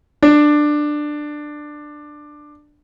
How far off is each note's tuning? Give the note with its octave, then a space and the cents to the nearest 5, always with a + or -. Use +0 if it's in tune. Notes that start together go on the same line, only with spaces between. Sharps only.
D4 +15